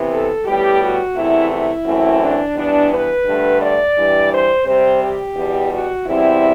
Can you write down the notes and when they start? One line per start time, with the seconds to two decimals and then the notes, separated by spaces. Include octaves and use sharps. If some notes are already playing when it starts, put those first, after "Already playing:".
Already playing: C3 E3 B3
0.10 A4
0.45 A2 G3 B3 G4
0.80 F#4
1.16 E2 C3 E3 A3 E4
1.50 E4
1.86 F#2 E3 A3 C4
2.21 D4
2.56 G2 E3 B3 D4
2.90 B4
3.26 G2 D3 A3
3.61 D5
3.96 G2 E3 G3
4.31 C5
4.66 C3 G3 C4 C5
5.01 G4
5.36 E2 B2 G3
5.71 F#4
6.06 E2 C3 G3 C4 E4